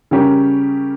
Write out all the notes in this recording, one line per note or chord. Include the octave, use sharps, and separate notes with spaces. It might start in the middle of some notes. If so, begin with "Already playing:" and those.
C#3 G3 C#4 G4 A#4